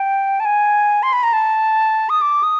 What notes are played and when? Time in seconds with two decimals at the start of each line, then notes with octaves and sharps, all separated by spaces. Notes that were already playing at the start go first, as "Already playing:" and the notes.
Already playing: G5
0.40 A5
0.45 G#5
1.03 C6
1.13 B5
1.23 A#5
1.33 A5
2.10 D#6
2.21 D6
2.43 D#6